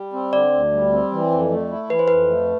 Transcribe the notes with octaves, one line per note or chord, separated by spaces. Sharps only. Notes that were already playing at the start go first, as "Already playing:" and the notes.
Already playing: G3
C4
D3 D5
D2
G3
C4
E3
F2
A3
E4
E3 B4
C5
F2 B4
A3